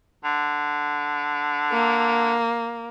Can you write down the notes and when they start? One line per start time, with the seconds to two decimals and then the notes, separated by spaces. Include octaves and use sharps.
0.24 D3
1.72 A#3